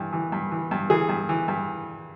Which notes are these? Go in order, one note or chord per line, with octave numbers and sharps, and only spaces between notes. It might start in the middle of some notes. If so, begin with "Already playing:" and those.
Already playing: G2 E3
E3
G2
E3
G2
E3 G#4
G2
E3
G2